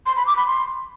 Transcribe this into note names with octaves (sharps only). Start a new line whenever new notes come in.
C6
B5
D6
B5
C6